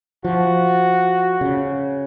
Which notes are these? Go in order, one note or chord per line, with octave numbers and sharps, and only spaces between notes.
F3 F#4
C#3